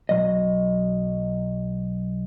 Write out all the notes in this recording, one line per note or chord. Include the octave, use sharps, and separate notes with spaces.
B1 F#3 D#5